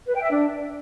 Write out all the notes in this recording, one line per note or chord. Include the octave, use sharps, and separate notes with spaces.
B4
G5
E5
D4